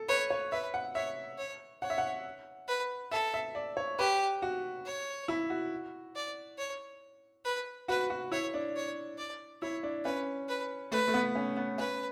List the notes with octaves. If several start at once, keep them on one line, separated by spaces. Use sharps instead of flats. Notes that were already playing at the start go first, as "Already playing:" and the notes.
Already playing: A4
B4 C#5
C#5
B4 E5
F#5
C#5 E5
C#5
C#5 F#5
E5
F#5
B4
A4 E5
E5
D5
C#5
G4 B4
F#4
C#5
E4
F#4
D5
C#5
B4
F#4 B4
F#4
E4 C#5
D4
C#5
D5
E4 C#5
D4
C#4 B4
B4
A3 B4
A3
B3
C#4
B3
C#4 B4